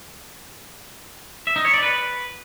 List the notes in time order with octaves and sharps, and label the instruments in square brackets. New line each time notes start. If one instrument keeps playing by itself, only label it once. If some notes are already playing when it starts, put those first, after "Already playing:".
[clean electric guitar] E5
D#4
C#5
D5
B4